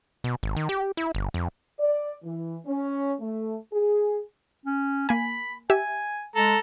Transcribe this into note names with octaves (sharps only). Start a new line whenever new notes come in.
B2
G#1
D#3
G4
E4
G1
F2
D5
E3
C#4
A3
G#4
C#4
A#3 G#5 B5
G4 E5 G#5
G#3 A4 A#5